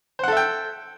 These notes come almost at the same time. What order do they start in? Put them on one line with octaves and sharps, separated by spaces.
C5 F#5 A4 E5 G5